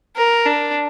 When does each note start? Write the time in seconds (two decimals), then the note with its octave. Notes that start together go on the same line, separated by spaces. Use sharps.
0.16 A#4
0.46 D4